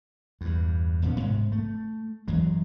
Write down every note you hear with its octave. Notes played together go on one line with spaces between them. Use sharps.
E2 G2
F1 A#2 B3 C#4
G#2 C3 G#3
A3
F#2 E3 F#3 G#3